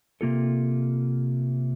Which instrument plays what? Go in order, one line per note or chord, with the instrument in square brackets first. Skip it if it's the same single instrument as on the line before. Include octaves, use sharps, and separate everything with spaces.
[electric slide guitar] C3 D#3 A#3 F4 A4